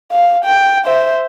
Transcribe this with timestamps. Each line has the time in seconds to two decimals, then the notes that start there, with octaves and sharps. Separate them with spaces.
0.12 F5
0.45 G5
0.85 C5 E5